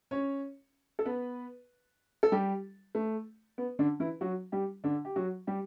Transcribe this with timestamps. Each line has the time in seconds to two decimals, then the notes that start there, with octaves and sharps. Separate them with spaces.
0.11 C#4 C#5
0.99 A4
1.06 B3 B4
2.23 A4
2.32 G3 G4
2.95 A3
3.58 B3
3.79 D3 D4
4.00 E3 E4
4.21 F#3 F#4
4.52 G3 G4
4.84 D3 D4
5.05 G4
5.16 F#3 F#4
5.47 G3 G4